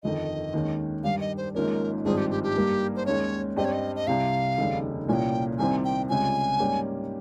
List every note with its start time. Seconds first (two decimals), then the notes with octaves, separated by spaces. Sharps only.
0.03 G1 F2 D#3 D#5
0.53 D#2 D#3 G#3 C#4
1.04 G2 D#3 G3 F5
1.21 D#5
1.37 C5
1.55 G#1 G#2 F3 A#3 C#4 A#4
2.05 G#1 G2 F3 C4 G#4
2.17 G4
2.31 G4
2.43 G4
2.56 G2 G3 A#3
2.96 C5
3.06 D#2 D#3 G#3 C#4 C#5
3.56 G2 G3 C4 G4 D#5
3.65 C#5
3.72 D#5
3.96 D#5
4.07 C2 C3 G3 F5
4.58 F1 D#2 C#3 G3
5.08 C2 A#2 F3 A#3 C#4 G5 G#5
5.58 C2 C3 D#3 G3 C4 G#5
5.84 G5
6.09 C#2 C3 G3 C#4 F4 G#5
6.60 G#2 G3 A#3 C#4 G4